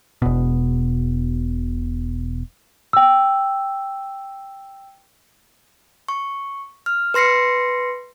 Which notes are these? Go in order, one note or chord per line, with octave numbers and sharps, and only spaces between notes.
E1 B2
G5 E6
C#6
F6
B4 C6 A#6 C7 C#7